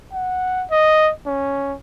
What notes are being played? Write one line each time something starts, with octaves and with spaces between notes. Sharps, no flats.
F#5
D#5
C#4